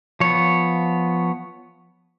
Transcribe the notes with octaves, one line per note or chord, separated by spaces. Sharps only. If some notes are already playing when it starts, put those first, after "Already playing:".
F3 B3 C#5